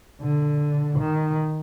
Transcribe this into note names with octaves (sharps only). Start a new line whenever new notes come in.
D3
D#3